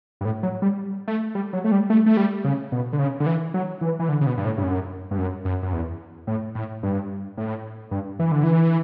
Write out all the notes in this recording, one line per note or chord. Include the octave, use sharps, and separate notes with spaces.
G2
A2
F#3
G3
A3
G3
F#3
A3
G3
A3
A3
G3
C#3
B2
D3
C#3
D3
E3
F#3
E3
E3
D3
C#3
B2
G2
A2
G2
F#2
G2
F#2
F#2
F#2
E2
A2
A2
G2
A2
G2
E3
D3
E3